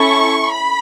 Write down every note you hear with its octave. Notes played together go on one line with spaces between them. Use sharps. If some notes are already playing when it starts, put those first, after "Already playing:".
Already playing: C#4 E4 A4 C#6
B5